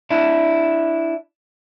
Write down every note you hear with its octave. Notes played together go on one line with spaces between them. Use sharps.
D4 E4